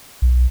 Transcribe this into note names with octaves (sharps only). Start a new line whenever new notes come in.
B1